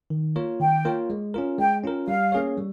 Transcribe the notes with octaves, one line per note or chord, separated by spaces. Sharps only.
D#3
A#3 F4 A#4 C#5
D#3 G5
A#3 F4 A#4 C#5
G#3
C#4 F4 A#4
G#3 G5
C#4 F4 A#4
G3 F5
A#3 C#4 G#4 C#5
G3